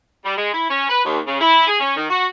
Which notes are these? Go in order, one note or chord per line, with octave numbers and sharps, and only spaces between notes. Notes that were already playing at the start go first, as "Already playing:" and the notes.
G3
G#3
E4
C#4
B4
D#2
C#3
E4
G#4
C#4
D#3
F#4